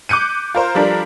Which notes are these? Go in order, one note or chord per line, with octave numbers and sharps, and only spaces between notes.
D6 F#6 G6 C#7 D#7
F4 A#4 C5
F3 G3 D4 A4 A#4